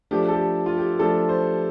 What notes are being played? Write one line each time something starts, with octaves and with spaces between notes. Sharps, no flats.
F3 A3 D4 G4
A4
G4
F4
G4
F3 A3 D4 A4
C5